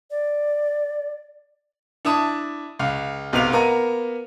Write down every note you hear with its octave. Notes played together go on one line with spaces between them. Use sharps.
D5
D4 E4 A5 D#6
C#2 F5
B1 C3 B3 F5 F7
A#3 B3 A#5 D#7